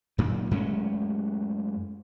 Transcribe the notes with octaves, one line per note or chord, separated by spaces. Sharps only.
F#2 A#2 D#3
F#2 G#3 A3 C#4